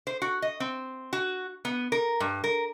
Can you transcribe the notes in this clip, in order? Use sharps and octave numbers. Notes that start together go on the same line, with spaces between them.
C5
F#4
D#5
C4
F#4
B3
A#4
G2
A#4